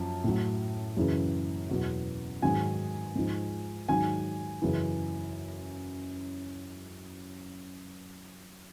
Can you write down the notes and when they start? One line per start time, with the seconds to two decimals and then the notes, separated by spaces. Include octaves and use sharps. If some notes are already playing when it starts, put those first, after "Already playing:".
Already playing: F#2 F3 A5
0.24 A2 F#3
0.97 F#2 C#3 E3
1.70 E2 B2 F#3
2.42 G#2 D#3 F#3 G#5
3.16 G#2 F3
3.89 G#2 D#3 F#3 G#5
4.62 F#2 C#3 E3